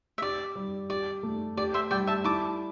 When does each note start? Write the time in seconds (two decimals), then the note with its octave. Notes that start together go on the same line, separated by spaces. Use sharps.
0.18 E5
0.22 G4 D5
0.56 G3
0.89 G4 D5
1.23 A3
1.57 G4 D5
1.74 C5 E5
1.91 G3 D5 G5
2.07 E5 A5
2.24 E4 A5 D6